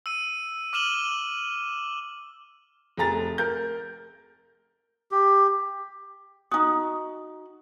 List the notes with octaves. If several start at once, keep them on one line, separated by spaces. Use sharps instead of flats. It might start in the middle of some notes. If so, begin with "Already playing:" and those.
E6 D#7
D6 F6 D#7 E7 F#7 G7
F1 G#4 A#5 A6
A#4 G6
G4
D#4 F#4 D#6